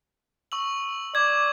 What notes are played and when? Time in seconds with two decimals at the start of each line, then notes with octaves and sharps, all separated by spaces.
0.52 C#6 E6 F#7
1.15 D5 D6 G#6